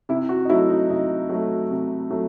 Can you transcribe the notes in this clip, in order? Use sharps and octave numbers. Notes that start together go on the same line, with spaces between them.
C3 E4
F#4
D#4
F#3 A3 E4
D#4
C3 D#4
F#3 A3
C3
F#3 A3